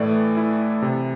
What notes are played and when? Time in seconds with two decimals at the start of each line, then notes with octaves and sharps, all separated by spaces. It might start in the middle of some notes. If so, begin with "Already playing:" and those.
Already playing: A2 E3 A3 D5
0.37 E4
0.82 C3